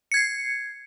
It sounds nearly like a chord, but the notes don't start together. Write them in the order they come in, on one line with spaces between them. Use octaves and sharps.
C#7 G#6 C7